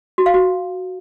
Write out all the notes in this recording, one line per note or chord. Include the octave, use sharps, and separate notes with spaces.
F#4
F5
F#4